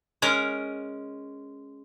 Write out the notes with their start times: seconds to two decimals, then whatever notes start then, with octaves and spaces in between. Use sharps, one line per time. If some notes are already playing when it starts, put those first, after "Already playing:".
0.22 G#3 C#4 A#4